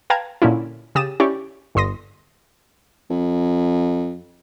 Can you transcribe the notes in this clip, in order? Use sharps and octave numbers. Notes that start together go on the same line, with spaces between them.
B4 F5 G5 A5 A#5 G#6
A#2 D3 C#4 E4
C#3 G4 D#6 A6 D#7 E7
C#4 E4 G4 D5 C#6
G1 G2 C6 D#6 A#6
F2